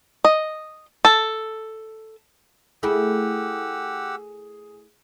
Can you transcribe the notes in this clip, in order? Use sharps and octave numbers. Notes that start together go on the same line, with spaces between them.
D#5
A4
A3 E4 G4 G#4 F#5 E6